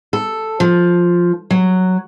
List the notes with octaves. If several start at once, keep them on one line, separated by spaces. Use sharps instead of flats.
A4
F3
F#3